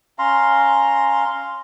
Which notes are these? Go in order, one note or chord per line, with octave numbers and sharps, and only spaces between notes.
C#4 F5 A#5 C6